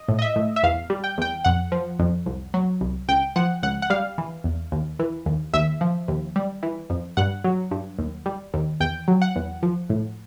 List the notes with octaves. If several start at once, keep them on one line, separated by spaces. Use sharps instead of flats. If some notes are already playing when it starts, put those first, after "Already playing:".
Already playing: D#5
A2
D#5
E5
A2
E5
E2 F5
G3
G5
E2 G5
F2 F#5
F3
F2
C2
F#3
C2
C#2 G5
F3 F#5
C#2 F#5
F#5
G3 F5
E3
E2
D#2
E3
D#2
D#2 E5
F3
D#2
G3
E3
F2
G2 F#5
F#3
G2
D#2
G3
D#2
E2 G5
F#3
F#5
E2
F3
A2